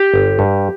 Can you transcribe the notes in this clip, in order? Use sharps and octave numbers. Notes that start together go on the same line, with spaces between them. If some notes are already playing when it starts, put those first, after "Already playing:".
Already playing: G4
G1
G2